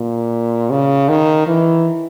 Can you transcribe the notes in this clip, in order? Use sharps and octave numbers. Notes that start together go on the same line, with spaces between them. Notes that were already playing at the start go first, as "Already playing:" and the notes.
Already playing: A#2
C#3
D#3
E3